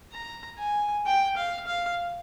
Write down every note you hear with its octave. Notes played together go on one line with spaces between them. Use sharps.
A#5
G#5
G5
F5
F5